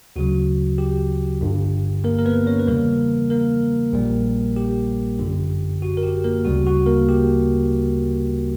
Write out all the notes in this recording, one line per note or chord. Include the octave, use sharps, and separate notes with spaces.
D2 C#3 F#3 F#4
G4
G1 G2 D3
A#3 A#4
A#4
B3 B4
C#4 C#5
B4
E2 C#3 E3 G3 A#3 A#4
A#3 A#4
A#1 A#2 G3
G4
G1 F#2 D3
F#4
A#4
G4
A#3 A#4
D2 C#3 G3 F#4
F#4
A#3 A#4
G4